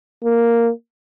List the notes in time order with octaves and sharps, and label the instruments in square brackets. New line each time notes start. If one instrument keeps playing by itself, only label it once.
[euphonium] A#3